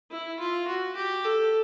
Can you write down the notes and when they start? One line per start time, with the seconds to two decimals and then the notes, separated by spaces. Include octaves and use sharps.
0.11 E4
0.39 F4
0.67 F#4
0.96 G4
1.24 A4